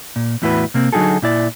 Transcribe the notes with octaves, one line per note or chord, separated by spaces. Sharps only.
A#2
E2 A2 E4 F#4 B4
C3 A#3 C4
D3 F#3 D#4 F#4 G#4 A4
A#2 E4 D5